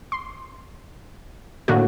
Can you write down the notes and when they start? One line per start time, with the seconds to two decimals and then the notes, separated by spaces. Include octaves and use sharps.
0.12 C6
1.68 A2 D3 A#3 F#4